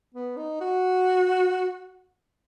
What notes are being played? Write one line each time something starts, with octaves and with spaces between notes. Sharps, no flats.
B3
D#4
F#4